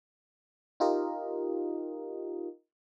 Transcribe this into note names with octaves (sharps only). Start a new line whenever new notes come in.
D#4 F4 G4 A#4 D#5